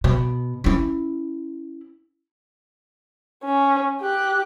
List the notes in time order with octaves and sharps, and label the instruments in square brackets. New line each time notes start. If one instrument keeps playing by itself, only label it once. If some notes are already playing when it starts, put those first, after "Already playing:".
[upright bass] B2
C#4 E4
[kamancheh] C#4
G4 F#6